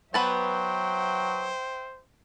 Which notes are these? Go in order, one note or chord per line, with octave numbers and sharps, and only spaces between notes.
F#3 B3 B4 C5 E5 G5 A5